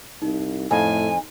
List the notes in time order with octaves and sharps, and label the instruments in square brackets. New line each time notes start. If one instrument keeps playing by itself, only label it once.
[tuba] C2 [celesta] D#4
[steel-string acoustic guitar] F2 [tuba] A2 [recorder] G#5